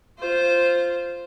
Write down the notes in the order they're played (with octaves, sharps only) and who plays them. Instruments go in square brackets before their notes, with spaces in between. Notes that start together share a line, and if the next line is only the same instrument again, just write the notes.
[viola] F4 C5